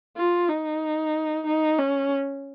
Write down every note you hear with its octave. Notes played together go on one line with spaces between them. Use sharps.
F4
D#4
D#4
C#4